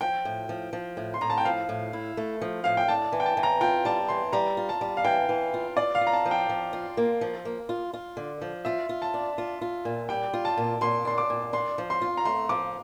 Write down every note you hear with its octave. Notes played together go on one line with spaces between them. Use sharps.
F3 G5
A2
F3
F3
A2
C6
A2 A#5
A5
G5
F3 F5
A2
E4
A3
F3
A2 F5
G5
D4 A5
E3
G5
A5
E3
A#5
F4 G5
G3 A5
E3 C6
G3 A#5
F4
A5
G3
F5
E3 G5
E3
F4
F4 D5
F5
F4
A#5
A5
F3
G5
F3
F4
A#3
F3
A#3
F4
F4
D3
F3
F4 E5
F4
A5
D4
F4
F4
A#2
G3 G5
F4
A5
A#2
A#2 C6
D4 C6
D6
A#2
D4 C6
F3
C6
F4
A#5
A3 C6
F3 D6